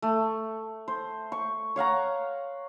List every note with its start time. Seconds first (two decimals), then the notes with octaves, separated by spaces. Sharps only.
0.02 A3
0.88 C5
1.32 C#6
1.76 C#5 F5 F#5 A#5